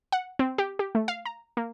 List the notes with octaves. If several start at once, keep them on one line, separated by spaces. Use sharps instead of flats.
F#5
C4
G4
G4
A3
F5
A#5
A#3